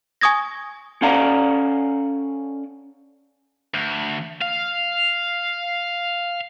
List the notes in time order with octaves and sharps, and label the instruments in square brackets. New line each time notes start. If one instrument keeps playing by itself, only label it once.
[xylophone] G#5 C#6 D#6 G#6 A#6
[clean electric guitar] C#4 A4 D5 F5 F#5 A#5
[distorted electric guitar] D2
F5